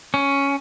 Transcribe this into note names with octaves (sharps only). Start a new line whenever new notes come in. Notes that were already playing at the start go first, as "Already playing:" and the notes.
C#4